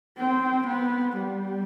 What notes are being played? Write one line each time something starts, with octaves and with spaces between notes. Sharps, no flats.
C4
B3
G3